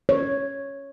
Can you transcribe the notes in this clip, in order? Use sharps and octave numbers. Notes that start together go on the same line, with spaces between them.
C#5